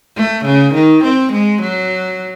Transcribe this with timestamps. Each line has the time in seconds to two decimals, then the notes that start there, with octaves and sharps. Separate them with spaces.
0.17 A3
0.45 C#3
0.74 D#3
1.04 C4
1.33 G#3
1.62 F#3